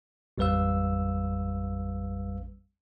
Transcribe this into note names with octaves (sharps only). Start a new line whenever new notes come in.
A1 F2 G3 B4 F5 E6